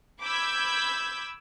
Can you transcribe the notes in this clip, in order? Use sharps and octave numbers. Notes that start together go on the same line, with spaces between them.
B5 D6 E6 G6 G#6 B6